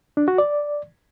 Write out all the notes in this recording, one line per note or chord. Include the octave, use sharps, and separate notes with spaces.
D4
F#4
D5